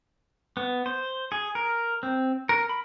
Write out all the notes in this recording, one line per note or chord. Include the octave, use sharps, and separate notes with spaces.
B3
C5
G#4
A#4
C4
A#4
B5